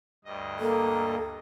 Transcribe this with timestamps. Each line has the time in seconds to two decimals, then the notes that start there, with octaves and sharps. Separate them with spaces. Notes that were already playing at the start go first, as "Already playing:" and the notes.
0.25 D2 G2 D#5
0.60 A#3 A4